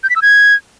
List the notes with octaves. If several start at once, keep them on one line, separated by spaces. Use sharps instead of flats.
G6
B6
E6
G#6